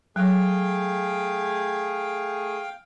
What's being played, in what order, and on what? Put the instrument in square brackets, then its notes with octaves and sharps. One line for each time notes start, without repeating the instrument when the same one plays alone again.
[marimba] F#3 [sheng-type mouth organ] A3 G#4 [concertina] F5 G5